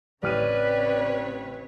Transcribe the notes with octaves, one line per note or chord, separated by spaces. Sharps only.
A1 C#3 C4 B4 C#5 D5 F6 D#7